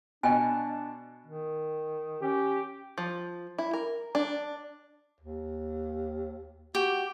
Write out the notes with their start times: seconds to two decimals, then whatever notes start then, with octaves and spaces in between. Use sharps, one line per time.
0.23 B2 D4 D#5 G5 G#5
1.26 D#3
2.22 C#4 G4
2.98 F3
3.58 E4
3.73 A#4
4.15 D4
5.21 D#2
6.75 F#4 G4